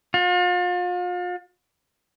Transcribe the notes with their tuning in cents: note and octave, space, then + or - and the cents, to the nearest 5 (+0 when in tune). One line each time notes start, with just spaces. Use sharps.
F4 +40